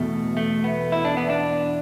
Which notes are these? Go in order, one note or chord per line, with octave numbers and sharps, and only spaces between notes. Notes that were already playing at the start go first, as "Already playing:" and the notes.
Already playing: E2 B2 A3
A3
B3
E4
D4
B3
D4